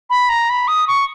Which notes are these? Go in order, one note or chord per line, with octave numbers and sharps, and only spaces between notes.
B5
A#5
B5
D#6
C#6